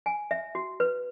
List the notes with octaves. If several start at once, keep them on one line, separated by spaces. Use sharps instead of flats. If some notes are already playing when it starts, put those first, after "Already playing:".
G#5
E5
F#4
B4